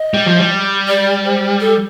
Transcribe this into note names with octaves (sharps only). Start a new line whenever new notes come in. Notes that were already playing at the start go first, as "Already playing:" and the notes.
Already playing: D#5
G3
F3
G3
D5
C5
A4